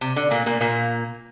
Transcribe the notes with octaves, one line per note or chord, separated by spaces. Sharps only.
C3
D3
A#2 A#3
A#2 A#3
A#2 A#3